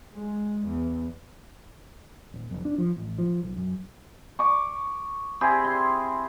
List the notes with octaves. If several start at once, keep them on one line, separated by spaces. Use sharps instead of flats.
G#3
E2
D#1
F1
D4
F3
A1
F3
B1
F#2
C#6 D6
C4 E4 G4 G#4
C6